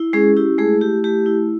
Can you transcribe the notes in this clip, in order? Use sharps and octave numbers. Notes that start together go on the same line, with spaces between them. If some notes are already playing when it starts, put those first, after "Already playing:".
Already playing: E4
G#3 C#4 G#4
E4 G4
G#3 A3 G#4
E4 G4
A3 G4
E4